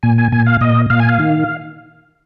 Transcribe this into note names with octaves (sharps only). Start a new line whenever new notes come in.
A#2 G#5
G#5
A#2 G#5
F5
A#2 D#5
A#2 F5
G#5
F5
D#3